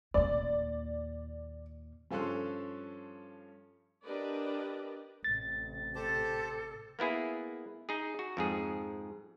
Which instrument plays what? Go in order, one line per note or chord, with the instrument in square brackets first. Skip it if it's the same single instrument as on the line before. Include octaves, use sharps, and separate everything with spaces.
[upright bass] D#2 A#2 [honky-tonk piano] D5
[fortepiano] G2 F3 C#4 A4 C6 F#6
[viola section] D4 G4 A#4 B4 D5 D#5
[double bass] A1 C3 [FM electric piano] A6
[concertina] G4 C5 A5 [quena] A4
[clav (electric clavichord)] A#3 B3 E4 G#4
D#4 G#4
F#4
F2 G#2 G#4